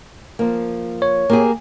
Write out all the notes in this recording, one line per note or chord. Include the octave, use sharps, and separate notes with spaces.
F3 A#3
C#5
A#3 G4 G#4